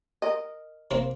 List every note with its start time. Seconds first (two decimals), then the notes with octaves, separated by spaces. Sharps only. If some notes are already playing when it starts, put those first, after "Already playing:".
0.22 A#4 D#5
0.91 C3 A#3 C4